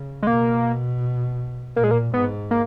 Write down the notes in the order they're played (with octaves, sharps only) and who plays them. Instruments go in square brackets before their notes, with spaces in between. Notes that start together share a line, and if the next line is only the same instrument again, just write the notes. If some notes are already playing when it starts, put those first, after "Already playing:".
Already playing: [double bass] C#3
[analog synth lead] G#3
[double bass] B2 [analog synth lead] A#3
[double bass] A#2 [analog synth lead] A#3
[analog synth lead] G#3
A#3
[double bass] G#2 [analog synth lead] B3
[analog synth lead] A#3